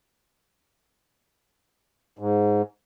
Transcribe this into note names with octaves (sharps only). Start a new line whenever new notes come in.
G#2